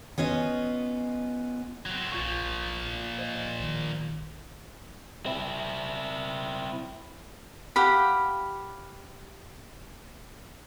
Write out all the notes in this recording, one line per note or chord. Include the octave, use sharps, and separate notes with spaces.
B3 C#4 F4 D#5
F#3 C4
A#1 A#2 F3 F4 C#6
C5 D#5
A1 D#3
C4 E4
G4 F5 F#5 B5